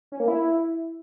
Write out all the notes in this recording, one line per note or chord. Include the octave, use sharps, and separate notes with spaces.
C#4
A#3
E4